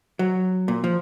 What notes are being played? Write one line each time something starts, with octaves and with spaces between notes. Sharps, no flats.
F#3
A#2
F3